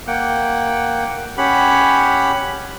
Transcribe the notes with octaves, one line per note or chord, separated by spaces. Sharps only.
A#3 F#5 G5
C#4 G4 F#5 B5